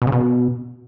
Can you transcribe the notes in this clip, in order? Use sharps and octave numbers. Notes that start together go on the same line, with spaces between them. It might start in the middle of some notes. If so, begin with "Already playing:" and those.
B2
C#3
B2